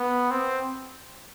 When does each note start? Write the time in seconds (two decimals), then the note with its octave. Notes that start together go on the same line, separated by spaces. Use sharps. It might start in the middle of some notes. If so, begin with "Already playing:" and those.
Already playing: B3
0.31 C4